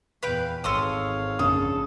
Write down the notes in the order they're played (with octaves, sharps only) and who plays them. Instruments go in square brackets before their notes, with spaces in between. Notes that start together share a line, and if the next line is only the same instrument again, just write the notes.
[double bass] E2 A#2 [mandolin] B4 F5 G5
[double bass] G#1 [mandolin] A4 C6 D#6 [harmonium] C#5 F5
[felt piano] A#1 C#3 D#6 [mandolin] A4